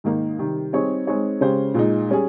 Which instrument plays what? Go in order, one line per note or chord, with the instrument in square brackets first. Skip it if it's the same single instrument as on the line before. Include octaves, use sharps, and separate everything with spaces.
[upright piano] G#2 D#3 A#3 D#4
C3 D#3 G3
G3 C4 D#4 G#4 C#5
G#3 C4 D#4 G#4 C#5
C#3 G#3 C#4 G4 C5
A#2 G#3 D#4
G3 C#4 G#4